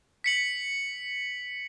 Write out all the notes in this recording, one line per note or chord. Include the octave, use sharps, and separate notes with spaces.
B6 C#7 F#7